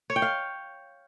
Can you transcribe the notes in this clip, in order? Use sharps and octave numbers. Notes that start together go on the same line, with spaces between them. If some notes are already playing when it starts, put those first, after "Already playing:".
C#5
G5
F5